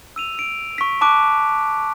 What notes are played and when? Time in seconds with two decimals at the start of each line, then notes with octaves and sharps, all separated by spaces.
0.16 E6 D#7 F7
0.35 E6 D7
0.78 C#6 B6
1.01 A5 C#6 D6 F#6 D7